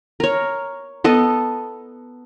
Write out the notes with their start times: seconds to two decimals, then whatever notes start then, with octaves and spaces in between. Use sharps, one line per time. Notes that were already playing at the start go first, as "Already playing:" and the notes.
0.20 A#4 C#5
1.04 B3 A4 D#5